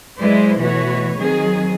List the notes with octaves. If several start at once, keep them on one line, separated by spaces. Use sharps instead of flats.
F#3 G#3 E4 B4 C5 D5
B2 E3 A3 F#4 B4 C#5
D#3 F#3 C4 G#4